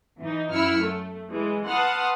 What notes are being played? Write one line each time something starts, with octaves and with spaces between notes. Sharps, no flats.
E3 D#4
F#2 E4 E6 F6 C#7
A3
E3 G#3
B4 F#5 A5 C6 D#6 F6